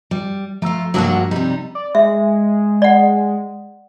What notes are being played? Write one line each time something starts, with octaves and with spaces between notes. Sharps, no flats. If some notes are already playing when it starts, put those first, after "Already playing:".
G3
F3 A3 F4 A#5 E6
G2 F#3 G#3 A#3 D4 F#4
C3 G3 D#4
D5
G#3 E5
D5 F#5